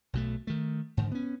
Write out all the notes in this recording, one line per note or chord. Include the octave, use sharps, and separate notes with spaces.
B1 B2 A3
D#3 A3
G#2 D3 D#3
B3 C#4